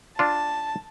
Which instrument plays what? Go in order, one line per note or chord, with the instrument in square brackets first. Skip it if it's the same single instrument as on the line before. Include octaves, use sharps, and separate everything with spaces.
[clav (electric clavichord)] D4 F4 [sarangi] A5